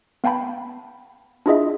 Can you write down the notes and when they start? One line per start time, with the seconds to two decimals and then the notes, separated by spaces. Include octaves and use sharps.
0.24 B3 F5 G5 A5 B5
1.46 D4 E4 F4 G#4 D#5 E5